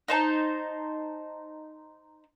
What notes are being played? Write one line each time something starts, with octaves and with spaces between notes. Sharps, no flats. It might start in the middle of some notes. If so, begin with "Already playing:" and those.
D#4 C5 A5